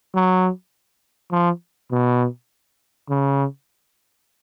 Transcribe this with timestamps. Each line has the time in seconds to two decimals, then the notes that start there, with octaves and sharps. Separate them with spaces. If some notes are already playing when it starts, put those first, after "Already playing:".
0.15 F#3
1.32 F3
1.91 B2
3.09 C#3